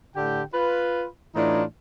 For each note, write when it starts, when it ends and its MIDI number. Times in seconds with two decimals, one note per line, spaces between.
0.16 0.41 45
0.16 0.41 50
0.16 0.41 67
0.16 0.41 79
0.53 1.06 65
0.53 1.06 71
1.35 1.62 45
1.35 1.62 52
1.35 1.62 62
1.35 1.62 63
1.35 1.62 65